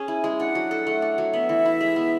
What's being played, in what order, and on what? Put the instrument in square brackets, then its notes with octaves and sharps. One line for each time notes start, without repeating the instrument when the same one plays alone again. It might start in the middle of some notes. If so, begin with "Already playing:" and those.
Already playing: [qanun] C#4 G#4 [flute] G#5
[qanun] E4
G#3
[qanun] D4 [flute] F#5
[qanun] F#3
A4
A3
D4
F#3
[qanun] B3 [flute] E5
[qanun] E3
E4
G#3
B3